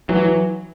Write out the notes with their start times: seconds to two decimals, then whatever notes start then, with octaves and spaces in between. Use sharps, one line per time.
0.09 E3 F#3